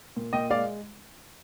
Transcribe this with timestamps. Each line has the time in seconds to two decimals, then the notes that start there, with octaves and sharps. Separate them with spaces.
0.17 A#2
0.33 A#2 D#5 G5
0.50 G#3 D5 F5